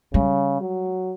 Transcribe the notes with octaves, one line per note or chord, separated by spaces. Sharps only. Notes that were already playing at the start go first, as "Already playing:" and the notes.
C#3 G3
F#3